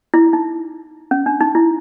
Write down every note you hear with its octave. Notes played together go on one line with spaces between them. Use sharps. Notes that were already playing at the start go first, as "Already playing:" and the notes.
E4
D#4
C#4
D4
D#4
E4